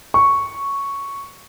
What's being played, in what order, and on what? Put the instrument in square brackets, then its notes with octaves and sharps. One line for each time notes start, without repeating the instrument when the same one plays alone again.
[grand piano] C#6